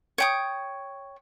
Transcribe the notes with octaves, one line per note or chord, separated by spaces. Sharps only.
C#5 G5 D#6